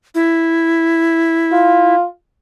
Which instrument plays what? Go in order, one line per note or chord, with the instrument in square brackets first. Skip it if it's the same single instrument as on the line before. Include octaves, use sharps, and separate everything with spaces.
[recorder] E4
[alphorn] F4